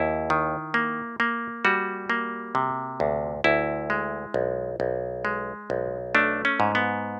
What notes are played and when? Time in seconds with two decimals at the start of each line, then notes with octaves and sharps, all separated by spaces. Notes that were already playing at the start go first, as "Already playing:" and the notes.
Already playing: D#2 E4
0.30 D#3
0.74 A#3
1.20 A#3
1.65 G3 F#4
2.10 A#3
2.55 C3
3.00 D2
3.44 D2 E4
3.90 G#3
4.34 B1
4.80 B1
5.25 G#3
5.70 B1
6.15 A3 D4
6.45 C#4
6.60 G#2
6.75 B3